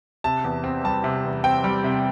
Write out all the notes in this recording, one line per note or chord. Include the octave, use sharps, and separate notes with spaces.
C3 A5
E2
C4
G3 A5
C3
E2
C4 G5
G3
C3